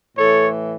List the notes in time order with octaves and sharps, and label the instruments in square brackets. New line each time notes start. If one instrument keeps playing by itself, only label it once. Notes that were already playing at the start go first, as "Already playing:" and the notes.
[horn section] A2 E3 A4 C#5